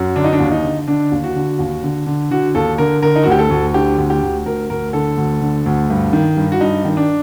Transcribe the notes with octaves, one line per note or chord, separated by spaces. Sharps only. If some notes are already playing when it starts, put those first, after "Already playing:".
Already playing: F#2
D3 D4
D#4
D4
D#2
D#4
D3
D3 D4
D#2
F#4
D3
D#2
D3
D3
D3 F#4
D#2 A4
D3 A#4
D3 A#4
D#4
F#4
D2 G4
A4
D2
D3 G4
D2
G4
D2
D2 A#4
D2 A#4
D3 A4
D2
D3
D2
G2
D#3
G2
F#4
G2 D#4
D#3
D4